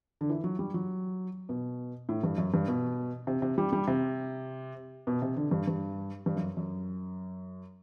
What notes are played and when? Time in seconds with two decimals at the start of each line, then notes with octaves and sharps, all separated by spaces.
0.21 D3
0.29 E3
0.44 F#3
0.59 G3
0.74 F#3
1.49 B2
2.09 A2
2.23 G2
2.38 F#2
2.54 G2
2.68 B2
3.27 C3
3.42 C3
3.58 G3
3.73 G3
3.87 C3
5.07 B2
5.22 C3
5.36 D3
5.51 G2
5.67 G2
6.26 G2
6.37 F#2
6.57 F#2